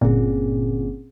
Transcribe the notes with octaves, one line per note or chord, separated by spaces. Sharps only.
G1 A#2 C4 C#4 G#4